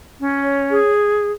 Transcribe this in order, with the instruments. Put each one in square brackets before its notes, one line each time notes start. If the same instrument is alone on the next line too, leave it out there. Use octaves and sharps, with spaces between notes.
[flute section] C#4
C#5
G#4